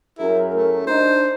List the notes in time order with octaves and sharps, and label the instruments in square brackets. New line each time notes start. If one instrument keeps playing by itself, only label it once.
[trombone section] F#2 G#4 A#4 [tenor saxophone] E4
[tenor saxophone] A3
[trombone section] D4 D#4 [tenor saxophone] C5